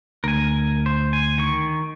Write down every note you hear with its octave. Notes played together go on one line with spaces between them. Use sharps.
D2 A#4 G#5
C5
G#5
D#3 C#6